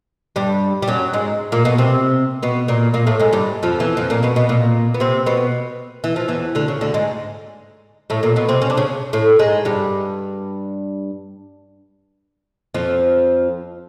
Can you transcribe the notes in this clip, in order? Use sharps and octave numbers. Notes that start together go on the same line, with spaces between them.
G2 G3
G3
F#2 F#3
G#2 G#3
A#2 A#3
B2 B3
C3 C4
B2 B3
A#2 A#3
A#2 A#3
A2 A3
G#2 G#3
G2 G3
F2 F3
E2 E3
F2 F3
A#2 A#3
B2 B3
B2 B3
A#2 A#3
B3
C3 C4
B2 B3
E3
F3
E2 E3
D2 D3
C#3
D2 D3
G#2 G#3
A2 A3
A#2 A#3
B2 B3
C3 C4
C#4
D4
C#3 C#4
A2 A3
G#2 G#3
G2 G3
F2 F3